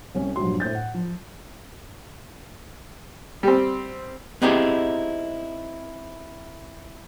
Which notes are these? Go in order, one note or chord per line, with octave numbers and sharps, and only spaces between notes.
C2 C#4
A#1 G2 F#3 C6
A2 C5 G6 A6
F#5
F3
G3 C4
B3 C4 D#4 E4 G4 G#4